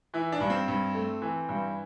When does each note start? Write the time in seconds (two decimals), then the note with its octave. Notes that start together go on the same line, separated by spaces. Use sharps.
0.14 E3 E4
0.32 D4
0.40 G2
0.50 C4
0.68 G2
0.95 A3
1.22 E3
1.49 G2